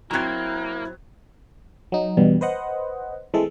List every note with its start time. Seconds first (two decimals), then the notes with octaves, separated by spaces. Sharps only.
0.11 F#3 A#3 C4 E4 A#5 F#6 G#6
1.92 F#3 D#4
2.17 E2 G2 B2 G3
2.41 B4 C5 D#5 F#5
3.34 E3 G#3 A3 C4 A4